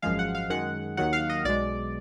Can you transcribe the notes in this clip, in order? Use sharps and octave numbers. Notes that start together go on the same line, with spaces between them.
G#1 F#2 F3 G#3 F5
F#5
F5
F#2 D#3 G#3 F#5
D#2 D#3 F#3 F#5
F5
D#5
B1 B2 G#3 D5